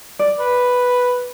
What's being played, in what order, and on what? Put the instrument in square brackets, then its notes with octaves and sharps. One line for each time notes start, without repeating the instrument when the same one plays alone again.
[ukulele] D5
[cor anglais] B4